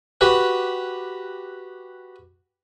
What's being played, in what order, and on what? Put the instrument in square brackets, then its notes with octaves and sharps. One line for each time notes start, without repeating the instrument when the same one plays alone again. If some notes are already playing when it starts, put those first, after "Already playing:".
[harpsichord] F#4 G4 B4